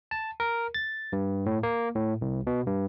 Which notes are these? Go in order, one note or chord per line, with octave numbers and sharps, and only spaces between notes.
A5
A#4
A6
G2
A2
A#3
A2
C2
B2
G2